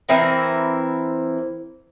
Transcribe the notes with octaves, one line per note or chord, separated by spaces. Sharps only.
E3 C4 E4 A#4